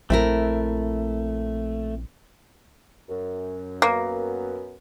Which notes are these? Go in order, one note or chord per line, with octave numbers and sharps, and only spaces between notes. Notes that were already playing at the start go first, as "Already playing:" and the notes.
A#1 A3 C4 E4 A#4
F#2
F#2 A#3 B3